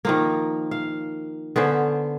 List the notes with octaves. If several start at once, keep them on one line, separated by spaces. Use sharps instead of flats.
D#3 F3 A#3
F5
D3 B3 C#4 C5